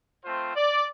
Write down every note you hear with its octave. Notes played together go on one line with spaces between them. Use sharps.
A3 C4 F4 C5
D5